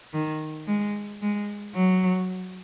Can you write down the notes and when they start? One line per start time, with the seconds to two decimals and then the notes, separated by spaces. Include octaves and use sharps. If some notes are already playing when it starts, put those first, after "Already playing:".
0.14 D#3
0.67 G#3
1.22 G#3
1.75 F#3